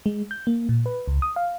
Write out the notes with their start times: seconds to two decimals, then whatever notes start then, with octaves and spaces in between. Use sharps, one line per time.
0.06 G#3
0.31 G6
0.47 A#3
0.69 A#2
0.86 B4
1.08 C#2
1.22 D#6
1.36 F5